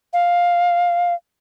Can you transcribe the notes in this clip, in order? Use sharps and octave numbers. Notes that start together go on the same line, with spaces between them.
F5